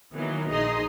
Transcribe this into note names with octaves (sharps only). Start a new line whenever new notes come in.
D#3 E3 F#3 A#3 B3
A#1 D#4 G#4 D#5 A#5 C6